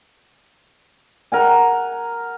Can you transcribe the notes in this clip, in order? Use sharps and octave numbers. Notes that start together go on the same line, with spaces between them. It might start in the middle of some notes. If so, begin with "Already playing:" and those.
A#4 F#5 G#5